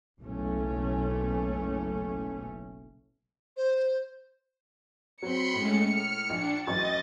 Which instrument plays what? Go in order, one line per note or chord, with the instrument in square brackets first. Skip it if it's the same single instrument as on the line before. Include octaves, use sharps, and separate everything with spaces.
[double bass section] F#1 B1 A3 C#4
[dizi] C5
[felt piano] F#3 C4 [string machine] B5 C6 [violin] C#7
[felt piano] A2 [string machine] G#3 A3 C#4
[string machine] F6
[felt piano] A#1 [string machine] D4
[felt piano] A1 F#2 C#6 [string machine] D#5 [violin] A6